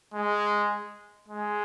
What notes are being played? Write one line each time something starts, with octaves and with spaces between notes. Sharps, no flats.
G#3
G#3